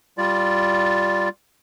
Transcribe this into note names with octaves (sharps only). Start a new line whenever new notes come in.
G3 F4 D5